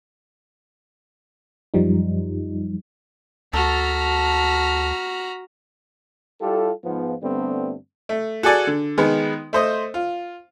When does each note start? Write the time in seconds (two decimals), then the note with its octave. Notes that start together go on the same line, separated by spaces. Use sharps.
1.74 F#2 F3 G3 D#4
3.53 D2 F#4 A4 A#5 F6 B6
6.41 G3 E4 F4 G4 A4
6.84 G#2 F3 B3
7.22 G2 D3 G3 A3 B3 C4
8.09 A3
8.43 F#4 G#4 A4 D5 G#5
8.67 D3
8.98 D#3 G#3 B3
9.53 A3 C5 D#5
9.94 F4